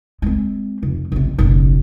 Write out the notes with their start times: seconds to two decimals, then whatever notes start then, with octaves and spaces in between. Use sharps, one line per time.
0.22 G#3 C4
0.83 F1
1.12 A1 C3
1.39 F#1 B1